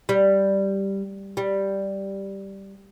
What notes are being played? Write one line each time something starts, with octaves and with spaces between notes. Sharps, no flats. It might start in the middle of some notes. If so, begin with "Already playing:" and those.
G3
G3